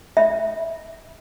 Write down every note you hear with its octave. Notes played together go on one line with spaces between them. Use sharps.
E5